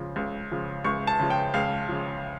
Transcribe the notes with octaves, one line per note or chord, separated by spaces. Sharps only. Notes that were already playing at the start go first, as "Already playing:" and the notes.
Already playing: C#2 C#3 F3
C#2
C#3 F3
C#2 C#6
A5
C#3 F3
G5
C#2 F5
C#3 F3